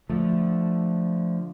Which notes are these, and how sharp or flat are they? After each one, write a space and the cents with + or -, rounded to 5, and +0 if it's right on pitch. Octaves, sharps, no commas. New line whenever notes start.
D3 +0 F3 +0 A3 +0